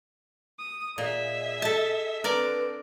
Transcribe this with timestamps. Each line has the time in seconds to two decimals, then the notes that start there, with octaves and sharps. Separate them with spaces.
0.58 D#6
0.98 A#2 G#4 D#5 E5
1.62 A4 A5
2.24 D3 C4 A#4 B4 D5